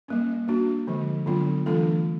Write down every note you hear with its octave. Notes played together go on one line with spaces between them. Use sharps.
G3 A#3 C#4
A#3 D4 F#4
D3 F3 G#3
D3 F#3 B3 D4 F4
E3 A3 D4 F4 A4